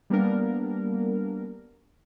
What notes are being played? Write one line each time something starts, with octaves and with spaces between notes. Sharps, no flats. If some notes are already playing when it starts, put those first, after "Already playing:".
G3 A#3 B3 D4 A#4